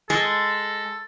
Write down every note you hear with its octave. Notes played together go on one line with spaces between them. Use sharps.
G#3 A4